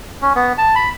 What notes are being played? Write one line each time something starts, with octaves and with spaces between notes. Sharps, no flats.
C#4
B3
A5
B5